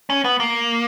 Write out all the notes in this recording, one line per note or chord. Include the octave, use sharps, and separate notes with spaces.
C#4
B3
A#3